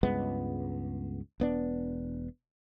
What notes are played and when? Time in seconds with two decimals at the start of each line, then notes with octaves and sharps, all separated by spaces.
0.03 C#2 G2 G#3 B3
1.40 E1 B3 D4